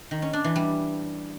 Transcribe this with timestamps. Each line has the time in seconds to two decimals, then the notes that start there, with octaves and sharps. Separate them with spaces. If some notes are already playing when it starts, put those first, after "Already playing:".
0.11 D#3
0.22 C#4
0.33 D4
0.44 E3
0.56 G3